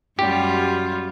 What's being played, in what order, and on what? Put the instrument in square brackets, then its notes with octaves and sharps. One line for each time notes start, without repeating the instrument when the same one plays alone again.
[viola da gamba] F#2 G3 F4 [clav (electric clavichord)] G4